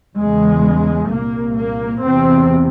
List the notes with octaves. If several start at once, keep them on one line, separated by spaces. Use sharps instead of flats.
E2 C#3 G#3
C2 A#2 A#3
A#3
E2 C3 C4